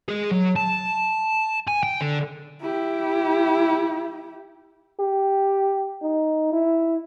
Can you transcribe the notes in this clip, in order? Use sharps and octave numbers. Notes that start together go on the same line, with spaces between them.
G#4 D#5
F#3
A5
G#5
G5
D3
E4 G4
G4
D#4
E4